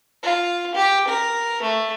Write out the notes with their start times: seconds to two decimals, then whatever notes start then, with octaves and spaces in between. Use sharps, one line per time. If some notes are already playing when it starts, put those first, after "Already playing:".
0.23 F4
0.75 G4
1.08 A#4
1.62 A3